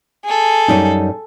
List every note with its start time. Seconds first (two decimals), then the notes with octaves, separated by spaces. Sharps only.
0.24 G#4 A4
0.68 F#2 G3 D#4